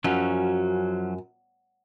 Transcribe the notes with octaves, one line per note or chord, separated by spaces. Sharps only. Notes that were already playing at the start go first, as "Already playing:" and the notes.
F#2 F3 F#3 C#4